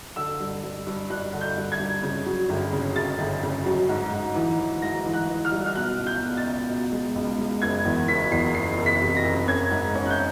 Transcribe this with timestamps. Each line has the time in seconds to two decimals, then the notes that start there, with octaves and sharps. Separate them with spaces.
0.16 D3 E6
0.40 G2
0.63 G2
0.87 G2
1.10 G2 F#6
1.33 D3
1.41 G6
1.56 G2
1.72 G#6
1.79 G2
2.03 C#3
2.26 F#3
2.49 G1
2.73 C#3
2.96 C#3 A6
3.19 G1
3.43 C#3
3.66 F#3
3.89 G#2
4.13 G#2
4.35 E3
4.59 E3
4.82 G#2 A#6
5.06 E3
5.13 F#6
5.29 E3
5.45 F6
5.52 G3
5.66 F6
5.75 B2 F#6
5.99 C#2
6.07 G6
6.22 B2
6.37 A6
6.45 C#2
6.68 B2
6.92 G#3
7.15 C#2
7.38 G#3
7.62 F#1 G#6
7.85 E2
8.08 F#1 B6
8.31 E2 C7
8.54 F#1 C7
8.78 F#1
8.86 B6
9.02 C3
9.17 A#6
9.25 F#1
9.48 C#4 G#6
9.71 G#2
9.95 C#4
10.06 F#6
10.10 G6